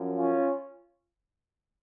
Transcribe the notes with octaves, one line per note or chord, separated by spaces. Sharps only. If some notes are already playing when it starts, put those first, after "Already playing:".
Already playing: F#2 F3
C#4 F4